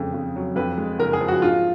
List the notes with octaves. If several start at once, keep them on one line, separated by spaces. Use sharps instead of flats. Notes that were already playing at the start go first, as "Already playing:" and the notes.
Already playing: F2 C#3 G#3
F2
F#3
F2 B4
G#3
F#1 A#4
G#4
F3
F#4
G#2 F4